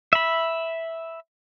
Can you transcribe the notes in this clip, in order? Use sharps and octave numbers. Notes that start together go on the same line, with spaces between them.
E5 B5